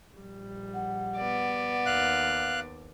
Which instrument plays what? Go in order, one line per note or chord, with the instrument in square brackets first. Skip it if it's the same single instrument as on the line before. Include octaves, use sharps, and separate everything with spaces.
[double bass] A#1 G3
[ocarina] F#5
[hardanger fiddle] B3 D5
[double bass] D#2 [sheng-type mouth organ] F5 F#6